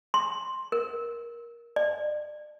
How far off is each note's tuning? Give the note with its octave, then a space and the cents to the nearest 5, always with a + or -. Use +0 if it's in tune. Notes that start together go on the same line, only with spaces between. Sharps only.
C6 +5
A#4 +15
D5 +35